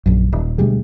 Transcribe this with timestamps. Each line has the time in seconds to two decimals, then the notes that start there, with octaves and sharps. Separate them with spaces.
0.06 A#1 F#2
0.33 D#1
0.58 D2 B2 G3 G#3